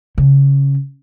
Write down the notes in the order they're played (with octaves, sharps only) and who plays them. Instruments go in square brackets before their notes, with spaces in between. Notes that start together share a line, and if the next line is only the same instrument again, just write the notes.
[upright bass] C#3